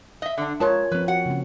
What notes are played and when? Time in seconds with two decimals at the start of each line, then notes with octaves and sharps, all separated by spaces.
0.22 D#5 E5
0.38 D3 D4
0.60 G#3 F4 A#4 C#5 A5
0.92 F3 C4 B4
1.08 F#4 F#5
1.26 C#3 A#3 C4